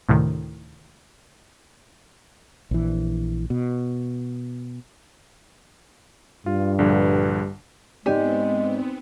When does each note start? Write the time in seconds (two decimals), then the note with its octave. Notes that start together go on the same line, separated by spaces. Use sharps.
0.09 D2 A2 C3 D#3
2.71 A#1 E3
3.50 B2
6.46 G2 F4
6.79 A#1 D3 G3
8.06 G#1 G#3 B3 C4 G4 D5 G#5